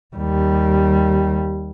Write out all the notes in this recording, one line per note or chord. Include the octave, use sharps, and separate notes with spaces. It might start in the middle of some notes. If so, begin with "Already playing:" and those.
D#2 G3